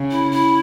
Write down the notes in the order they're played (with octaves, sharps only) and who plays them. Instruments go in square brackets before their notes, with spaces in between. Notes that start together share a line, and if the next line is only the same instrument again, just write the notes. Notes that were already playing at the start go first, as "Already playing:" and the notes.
Already playing: [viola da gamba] C#3
[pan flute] E4
E4